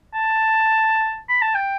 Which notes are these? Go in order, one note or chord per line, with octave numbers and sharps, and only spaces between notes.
A5
B5
A5
G5